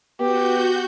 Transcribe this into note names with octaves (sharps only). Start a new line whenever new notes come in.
B3 F#4 G4 G6